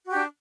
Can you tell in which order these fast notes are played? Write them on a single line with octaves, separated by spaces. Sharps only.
F#4 G4 D4